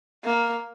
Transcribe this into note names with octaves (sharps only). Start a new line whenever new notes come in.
A#3